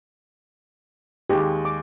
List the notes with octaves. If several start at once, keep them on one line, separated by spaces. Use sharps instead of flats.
D#2 G#3 G4
D6